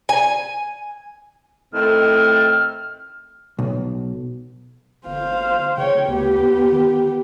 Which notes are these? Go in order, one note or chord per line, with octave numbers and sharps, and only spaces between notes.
G#5
A2 D#3 C4 F6
B1
G1 C5 F5
C#3 C#5 G5
D2 B3 G4
D#2
D#3